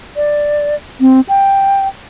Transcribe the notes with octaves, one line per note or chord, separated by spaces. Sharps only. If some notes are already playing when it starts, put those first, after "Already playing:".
D5
C4
G5